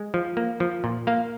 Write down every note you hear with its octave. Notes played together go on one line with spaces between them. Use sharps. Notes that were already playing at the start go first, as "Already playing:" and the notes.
Already playing: G#3
F3
A#3
F3
A#2
A#3 F5